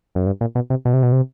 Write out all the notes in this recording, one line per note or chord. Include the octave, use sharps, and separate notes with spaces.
F#2
G2
A#2
B2
C3
B2
C3
B2
C3